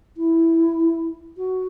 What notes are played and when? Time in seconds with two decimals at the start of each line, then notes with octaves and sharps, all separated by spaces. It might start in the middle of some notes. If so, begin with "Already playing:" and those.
0.17 E4
1.37 F#4